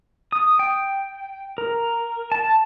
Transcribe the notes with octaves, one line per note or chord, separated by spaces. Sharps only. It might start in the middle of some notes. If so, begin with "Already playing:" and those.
D#6
G5
A#4
A5